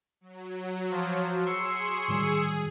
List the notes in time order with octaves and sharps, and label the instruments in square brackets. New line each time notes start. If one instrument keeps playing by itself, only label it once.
[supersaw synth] F#3
[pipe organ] F3
[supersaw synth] G#4 [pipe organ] C6 C#6 E6
[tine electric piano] A2 D#3 G3